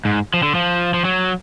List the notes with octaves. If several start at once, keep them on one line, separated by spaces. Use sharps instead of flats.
G#2
F3
D3
F3
F3
F#3